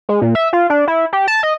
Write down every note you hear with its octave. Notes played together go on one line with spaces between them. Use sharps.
G#3
A#2
E5
F4
D4
E4
G4
A5
D#5